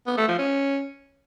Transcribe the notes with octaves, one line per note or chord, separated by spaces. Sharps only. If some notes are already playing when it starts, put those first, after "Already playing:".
B3
A3
F3
C#4